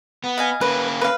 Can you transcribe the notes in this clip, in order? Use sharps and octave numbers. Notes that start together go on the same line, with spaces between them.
B3
D#5 F5 G#5
A#3 C#4 B4
B4 F5